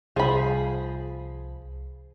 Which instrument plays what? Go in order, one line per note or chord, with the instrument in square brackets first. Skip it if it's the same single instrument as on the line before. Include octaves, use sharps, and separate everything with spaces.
[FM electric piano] C2 [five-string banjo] F3 B5 [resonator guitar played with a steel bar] G#4